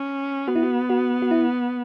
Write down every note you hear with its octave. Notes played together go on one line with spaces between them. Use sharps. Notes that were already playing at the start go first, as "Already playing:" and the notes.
Already playing: C#4
B3 F#4
E4
F#4
F#4
F#4
E4